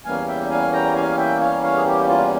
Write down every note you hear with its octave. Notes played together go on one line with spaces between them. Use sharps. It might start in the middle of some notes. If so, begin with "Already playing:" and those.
E2 E3 G3 A#3 C#4 F5 G#5
E5 G5
F5 G#5
G5 A#5
F5 G#5
E5 G5
C#5 F5
C#5 F5
G#4
G4
F4